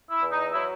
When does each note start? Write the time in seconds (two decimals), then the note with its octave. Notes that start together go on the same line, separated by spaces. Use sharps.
0.09 E4
0.20 E2
0.31 D#4
0.53 F#3 E4